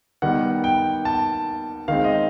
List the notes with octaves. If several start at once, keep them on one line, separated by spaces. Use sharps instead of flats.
D#3 G3 B3 F#5
G5
A5
D#3 G#3 C4 F5
D#5